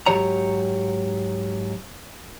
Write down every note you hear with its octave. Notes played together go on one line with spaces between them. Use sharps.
G#2 D#3 F#3 G4 C#5 A#5